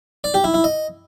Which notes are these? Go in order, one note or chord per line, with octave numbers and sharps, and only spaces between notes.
D5
G4
E4
E4
D#5